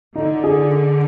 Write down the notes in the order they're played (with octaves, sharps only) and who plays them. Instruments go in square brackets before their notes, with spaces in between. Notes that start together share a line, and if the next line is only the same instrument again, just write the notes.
[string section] D3 [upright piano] D#4
[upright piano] G#4